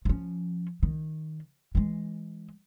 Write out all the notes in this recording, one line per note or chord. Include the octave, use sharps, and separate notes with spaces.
F3 C#4
D#3
E3 G#3